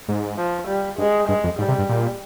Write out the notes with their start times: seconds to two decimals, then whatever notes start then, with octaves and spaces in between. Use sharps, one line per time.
0.08 G#2
0.38 F3
0.68 G3
0.98 G2 G#3
1.28 G2 G#3
1.44 F2
1.59 G#2 G3
1.68 C3
1.78 G2
1.89 A#2